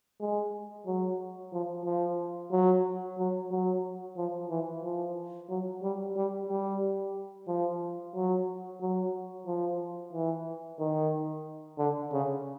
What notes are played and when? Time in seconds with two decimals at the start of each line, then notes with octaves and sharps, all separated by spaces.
0.20 G#3
0.86 F#3
1.52 F3
1.85 F3
2.51 F#3
3.18 F#3
3.51 F#3
4.17 F3
4.50 E3
4.83 F3
5.49 F#3
5.82 G3
6.16 G3
6.49 G3
7.48 F3
8.15 F#3
8.81 F#3
9.47 F3
10.13 E3
10.79 D#3
11.78 D3
12.12 C#3